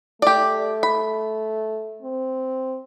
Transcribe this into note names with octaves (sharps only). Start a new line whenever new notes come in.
A3 G4 D5
B5
C4